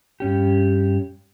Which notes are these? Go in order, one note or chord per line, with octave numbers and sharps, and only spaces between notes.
G2 C#4 G4